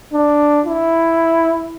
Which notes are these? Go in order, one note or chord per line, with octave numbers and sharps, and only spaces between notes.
D4
E4